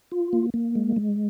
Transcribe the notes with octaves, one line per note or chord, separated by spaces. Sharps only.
F4
A#3
A#3
G#3
G#3